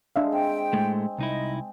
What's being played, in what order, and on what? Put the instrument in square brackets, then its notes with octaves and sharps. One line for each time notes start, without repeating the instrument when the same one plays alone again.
[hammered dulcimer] G#3 [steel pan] D4 E5 F5
[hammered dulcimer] C4 [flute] G5
[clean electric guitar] A2 G#3 A3
[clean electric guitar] C2 D#4 E4 [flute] D#5